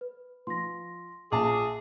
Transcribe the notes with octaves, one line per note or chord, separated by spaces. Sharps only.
B4
F3 C6 A#6
A#1 F4 G#4 A5 D6